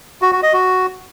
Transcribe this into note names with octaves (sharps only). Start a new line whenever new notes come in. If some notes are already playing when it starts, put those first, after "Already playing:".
F#4
F#4
D#5
F#4